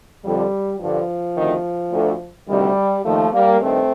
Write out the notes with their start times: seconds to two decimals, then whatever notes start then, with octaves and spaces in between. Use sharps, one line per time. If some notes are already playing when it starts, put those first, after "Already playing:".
0.23 F2 D3 G3
0.79 G2 D3 F3
1.35 D2 C3 D#3
1.92 D2 D3
2.47 D2 C3 D#3 G3
3.04 D#2 D#3 F3 A3
3.32 G3 A#3
3.60 G2 D#3 A3 C4